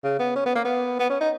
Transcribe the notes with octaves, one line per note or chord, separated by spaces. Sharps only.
C#3
B3
C#4
B3
A#3
B3
B3
C#4
D#4